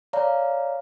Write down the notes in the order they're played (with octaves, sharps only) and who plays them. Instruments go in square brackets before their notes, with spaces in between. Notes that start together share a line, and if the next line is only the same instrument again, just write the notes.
[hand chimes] C#5 D5 F5 A#5